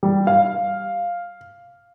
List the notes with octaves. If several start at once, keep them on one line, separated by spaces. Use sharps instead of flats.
G3
F5